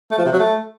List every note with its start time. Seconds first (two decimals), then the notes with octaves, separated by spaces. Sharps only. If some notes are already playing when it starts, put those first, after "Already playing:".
0.11 A3
0.18 F3
0.25 C3
0.32 F#3
0.39 A3